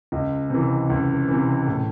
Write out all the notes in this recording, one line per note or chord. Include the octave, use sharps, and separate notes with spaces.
C#2
C3 E3
C#2
C3 E3
A2